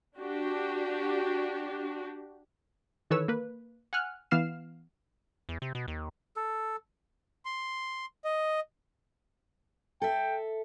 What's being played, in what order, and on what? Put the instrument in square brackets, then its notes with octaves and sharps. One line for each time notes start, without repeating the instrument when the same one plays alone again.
[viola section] D4 F#4 G4
[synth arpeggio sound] D#3 E3 A4 B4 C#5 E6
A#3 B4
F#5 G#5 F6 F#6
E3 B3 F5 F6 C7 E7
[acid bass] E2
C3
B2
D#2
[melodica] A4
[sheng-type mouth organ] C6
D#5
[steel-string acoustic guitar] A4 E5 [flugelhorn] G5